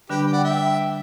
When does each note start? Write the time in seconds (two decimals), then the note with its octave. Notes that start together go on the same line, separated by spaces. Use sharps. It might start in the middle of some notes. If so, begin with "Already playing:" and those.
0.09 D3 G3 D4 G4 B4
0.27 G5
0.32 D5 F#5
0.44 E5 G5